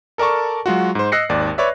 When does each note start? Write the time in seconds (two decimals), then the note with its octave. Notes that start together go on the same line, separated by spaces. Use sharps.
0.18 A4 A#4 D5 A5 C#6
0.66 F#3 G#3 F4 F#4
0.95 G#2 C5
1.12 D#5 E6 F#6 A#6 C7 C#7
1.29 G#1 D#2 D5
1.58 B4 C#5 D5 E5